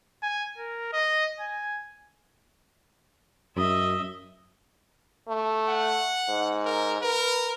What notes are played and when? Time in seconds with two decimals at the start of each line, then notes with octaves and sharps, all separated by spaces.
0.23 G#5
0.58 A#4
0.93 D#5
1.40 G#5
3.57 F#2 D#5 E5
5.28 A3
5.68 F#5
6.28 G#2
6.65 A#4
7.02 A#4 B4